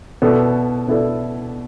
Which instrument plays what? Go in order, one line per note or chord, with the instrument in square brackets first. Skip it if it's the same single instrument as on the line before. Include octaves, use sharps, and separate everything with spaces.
[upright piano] B2 B3 E4 A4 D5
B2 B3 E4 A4 D5